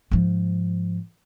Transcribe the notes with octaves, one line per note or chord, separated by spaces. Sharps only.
G#2 F3